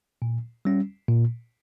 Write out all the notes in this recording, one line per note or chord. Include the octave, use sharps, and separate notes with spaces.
A#2
G3 C#4
A#2